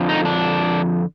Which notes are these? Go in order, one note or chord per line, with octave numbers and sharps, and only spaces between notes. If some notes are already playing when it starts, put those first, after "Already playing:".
Already playing: F2 D3 F3
D#4
D4